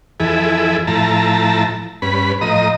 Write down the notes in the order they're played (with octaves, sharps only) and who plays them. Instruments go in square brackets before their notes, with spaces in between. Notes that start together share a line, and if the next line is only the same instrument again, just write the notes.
[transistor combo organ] F2 E3 E4 G#4 A4
A2 F3 E4 A5 A#5
G2 C#4 B4 B5
A2 F3 D#5 A#5 D#6